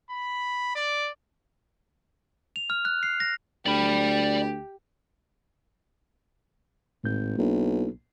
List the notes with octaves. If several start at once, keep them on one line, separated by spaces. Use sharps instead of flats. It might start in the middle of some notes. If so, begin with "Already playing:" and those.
B5
D5
F7
F6
F#6
C7
A#6
D2 G4 D5 B5
G#1 A2 G6
B1 A#3 D4 E4